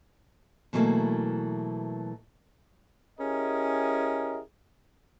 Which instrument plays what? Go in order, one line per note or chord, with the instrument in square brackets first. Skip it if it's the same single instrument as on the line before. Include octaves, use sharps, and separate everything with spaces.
[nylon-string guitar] B2 E3 F#3 G3 A3 A#3
[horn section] C#4 E4 G4 G#4 A#4 D#5